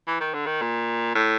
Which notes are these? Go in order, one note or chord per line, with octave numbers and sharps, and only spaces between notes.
E3
D#3
D3
D#3
A#2
A2